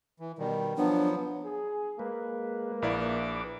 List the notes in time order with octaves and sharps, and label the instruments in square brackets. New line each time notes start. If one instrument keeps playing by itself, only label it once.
[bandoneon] E3
B2 D#3 G3
[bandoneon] F3 F#3 B3 [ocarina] D4
[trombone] G#4
[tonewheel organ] G#3 B4 [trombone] A#3
[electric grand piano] A#1 E4 D5 [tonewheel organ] B4 D6